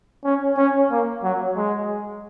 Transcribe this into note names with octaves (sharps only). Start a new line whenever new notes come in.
C#4
C#4
A#3
F#3
G#3